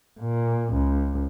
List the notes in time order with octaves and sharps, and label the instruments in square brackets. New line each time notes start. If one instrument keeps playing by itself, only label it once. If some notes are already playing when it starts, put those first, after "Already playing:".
[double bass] A#2
C#2